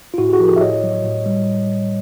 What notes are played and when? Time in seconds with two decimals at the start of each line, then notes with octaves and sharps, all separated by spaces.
0.14 F4
0.18 A2 E4 F#4
0.29 G4
0.33 F#4 G#4
0.40 F3 A#4
0.47 G4 A4
0.56 E5
0.61 A2 C#5 D#5
0.83 F#3
1.04 A2
1.26 G3